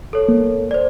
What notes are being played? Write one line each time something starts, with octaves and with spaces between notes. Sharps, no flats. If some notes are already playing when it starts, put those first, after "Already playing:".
A4 C#5
A#3
C5 D5